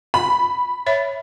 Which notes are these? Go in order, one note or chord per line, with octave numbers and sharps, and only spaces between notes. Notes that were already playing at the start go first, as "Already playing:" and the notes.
B5
C#5 E5